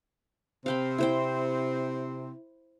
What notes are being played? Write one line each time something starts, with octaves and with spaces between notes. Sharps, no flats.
C3 C4 F5 G5 B5
E4 C5 G5